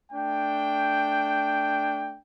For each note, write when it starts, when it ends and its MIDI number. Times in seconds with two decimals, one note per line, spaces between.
0.12 2.18 57
0.12 2.18 62
0.12 2.18 79